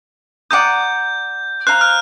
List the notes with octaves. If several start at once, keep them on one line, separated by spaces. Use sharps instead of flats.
D5 F#5 A#5 D#6 G6
C5 F5 A#5 F#6
F6